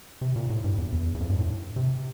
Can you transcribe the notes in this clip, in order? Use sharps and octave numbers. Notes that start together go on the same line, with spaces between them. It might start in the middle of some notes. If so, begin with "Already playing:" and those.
C3
A#2
A2
G2
E2
E2
E2
F2
G2
A2
C3